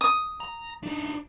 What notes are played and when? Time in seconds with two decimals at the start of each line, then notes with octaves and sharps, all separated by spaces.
0.01 D#6
0.40 A#5
0.83 D4 D#4